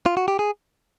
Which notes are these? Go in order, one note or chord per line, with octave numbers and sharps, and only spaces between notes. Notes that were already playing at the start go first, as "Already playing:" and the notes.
F4
F#4
G4
G#4